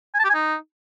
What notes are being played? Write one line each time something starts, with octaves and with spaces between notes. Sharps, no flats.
G#5
A5
G4
G#5
D#4